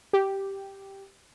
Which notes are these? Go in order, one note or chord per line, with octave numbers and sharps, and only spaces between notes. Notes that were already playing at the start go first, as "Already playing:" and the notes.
G4